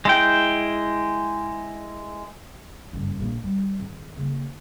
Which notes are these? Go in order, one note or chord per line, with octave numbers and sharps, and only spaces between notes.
G#3 E4 G5
F#1 G2
A#1 A#3
G3
G#1
C#3 A#3